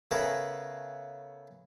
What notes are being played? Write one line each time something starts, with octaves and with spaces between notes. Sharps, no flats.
C#3 A3 B3 G#4 A#4 B4